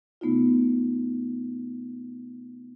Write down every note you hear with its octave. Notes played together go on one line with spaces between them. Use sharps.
C3 A3 B3 D#4 F4